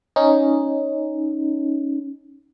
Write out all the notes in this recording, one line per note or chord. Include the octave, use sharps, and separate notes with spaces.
C#4 D#4